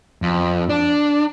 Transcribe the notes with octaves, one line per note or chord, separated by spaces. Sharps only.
F2
D4